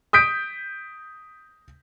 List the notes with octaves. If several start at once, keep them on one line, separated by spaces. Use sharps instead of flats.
D#6 G6 B6 D7